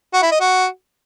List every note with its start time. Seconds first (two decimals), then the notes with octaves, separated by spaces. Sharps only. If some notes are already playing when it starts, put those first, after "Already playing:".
0.14 F#4
0.23 E4
0.32 D#5
0.41 F#4